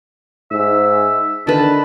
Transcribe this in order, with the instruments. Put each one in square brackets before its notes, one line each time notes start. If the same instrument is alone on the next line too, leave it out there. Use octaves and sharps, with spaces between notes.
[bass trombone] G#2 [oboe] E5
[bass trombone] D3 [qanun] D#3 B4 [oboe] A5